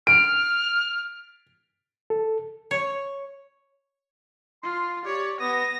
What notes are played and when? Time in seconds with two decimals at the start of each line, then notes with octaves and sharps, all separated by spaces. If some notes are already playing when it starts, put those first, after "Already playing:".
0.07 F6 D7
2.10 A4
2.71 C#5
4.63 F4 C6
5.05 G4 C#5 D5
5.40 B3 D#6 A#6